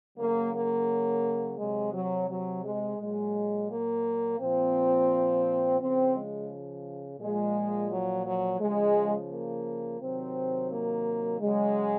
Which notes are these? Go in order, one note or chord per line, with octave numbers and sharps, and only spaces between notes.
C#3 F#3 A#3
A#3
C3 F#3 G#3
F#3
F#3
G#3
A#2 F#3 G#3
A#3
A#2 F3 C4
C#3 F3 C4
G#3
A#2 F3 G#3
F#3
F#3
C#3 F3 G#3
A#3
C3 D#3 F#3 C4
A#3
C#3 F#3 G#3